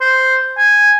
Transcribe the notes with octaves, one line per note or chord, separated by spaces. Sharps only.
C5
G#5